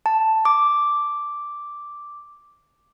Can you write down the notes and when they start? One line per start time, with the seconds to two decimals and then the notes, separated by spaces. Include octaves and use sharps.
0.06 A5
0.45 D6